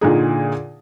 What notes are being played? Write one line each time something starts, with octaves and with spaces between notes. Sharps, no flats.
A#2 D3 D#4 G#4